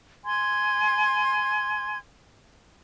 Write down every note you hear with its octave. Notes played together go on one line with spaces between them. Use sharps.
G#5 C6 G#6